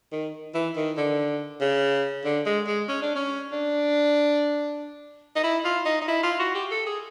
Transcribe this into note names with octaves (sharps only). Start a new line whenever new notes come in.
D#3
E3
D#3
D3
C#3
D3
G#3
G#3
C#4
D4
C#4
D4
D#4
E4
F4
D#4
D#4
E4
F4
F#4
G4
A4
G#4